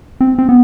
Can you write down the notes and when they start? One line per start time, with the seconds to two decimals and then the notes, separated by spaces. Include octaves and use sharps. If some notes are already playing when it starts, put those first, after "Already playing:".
0.21 C4
0.38 C4
0.49 B3